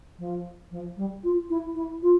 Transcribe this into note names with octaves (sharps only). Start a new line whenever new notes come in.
F3
F3
G3
F4
E4
E4
F4